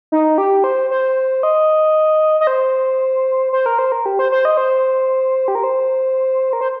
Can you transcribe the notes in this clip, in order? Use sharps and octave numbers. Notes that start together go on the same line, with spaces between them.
D#4
G4
C5
C5
D#5
D#5
C5
C5
A#4
C5
A#4
G4
C5
C5
D#5
C5
G4
A#4
C5
A#4
C5